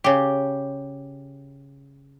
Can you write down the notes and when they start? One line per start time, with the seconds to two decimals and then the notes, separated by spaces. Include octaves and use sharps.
0.04 C#3 G4